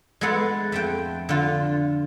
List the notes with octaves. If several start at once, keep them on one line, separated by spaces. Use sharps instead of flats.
G#3 A3 B3 A4 F#5
F2 A3 G5
D3 F4